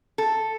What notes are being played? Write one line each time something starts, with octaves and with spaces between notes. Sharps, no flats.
A4